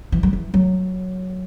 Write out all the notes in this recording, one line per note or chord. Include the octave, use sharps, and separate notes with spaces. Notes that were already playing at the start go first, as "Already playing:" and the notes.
E3
F#3
E3
F#3